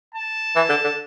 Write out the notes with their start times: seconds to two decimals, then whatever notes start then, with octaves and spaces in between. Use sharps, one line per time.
0.14 A5
0.56 E3
0.69 D3
0.84 D3